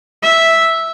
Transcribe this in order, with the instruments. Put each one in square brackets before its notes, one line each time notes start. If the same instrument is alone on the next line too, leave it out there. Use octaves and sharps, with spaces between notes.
[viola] E5